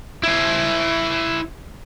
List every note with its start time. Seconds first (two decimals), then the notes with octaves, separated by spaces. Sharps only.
0.23 E4 C5